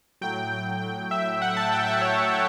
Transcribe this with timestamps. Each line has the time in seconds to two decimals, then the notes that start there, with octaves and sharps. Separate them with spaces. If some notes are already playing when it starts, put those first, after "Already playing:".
0.21 A2 F#3 G5
0.52 G5
0.82 G5
1.11 E5
1.42 F#5
1.57 A5
1.72 G5
1.87 E5
2.01 C#5
2.33 C#5